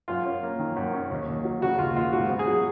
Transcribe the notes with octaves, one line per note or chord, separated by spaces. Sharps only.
F#2 F4
C#4
A#3
D#3
F#2
C#4
D#2
D#2
F#3
C#3 F#4
D#2 F4
D#2 F4
G#2 F#4
B3
G#4
F#3